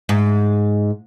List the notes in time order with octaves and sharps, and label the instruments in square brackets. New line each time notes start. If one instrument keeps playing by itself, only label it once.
[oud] G#2